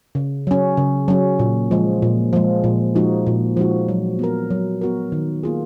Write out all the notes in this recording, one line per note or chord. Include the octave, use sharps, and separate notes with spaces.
C#3
F#3 C#4
C#3
F#3 C#4
A#2
F3 G#3
A#2
F3 G#3
A#2
F3 G#3 D#4 F#4
A#2
F3 G#3 D#4 F#4
F#3
B3 F#4 A#4
F#3
B3 F#4 A#4
D#3
A#3 F4 G#4